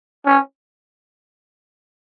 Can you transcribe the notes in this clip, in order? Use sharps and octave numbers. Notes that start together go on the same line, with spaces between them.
C#4